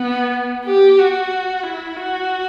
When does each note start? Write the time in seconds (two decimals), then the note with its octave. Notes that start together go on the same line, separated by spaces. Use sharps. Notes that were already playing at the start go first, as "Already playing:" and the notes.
Already playing: B3
0.66 G4
0.98 F#4
1.63 E4
1.96 F#4